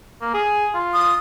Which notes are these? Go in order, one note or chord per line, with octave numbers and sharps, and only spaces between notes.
A#3
G#4
F4
D#6